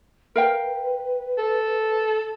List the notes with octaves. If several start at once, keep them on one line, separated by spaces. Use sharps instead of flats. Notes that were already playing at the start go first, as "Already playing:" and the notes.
A#4 B4 F5 G5
A4